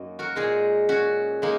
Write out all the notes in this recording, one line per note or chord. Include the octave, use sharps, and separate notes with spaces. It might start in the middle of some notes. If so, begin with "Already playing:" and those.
Already playing: F#2 F#3 A#3 D#4
F#4 A#4
A#2 G#3 D#4 G#4
C#4 F#4
G#3 A#3 D#4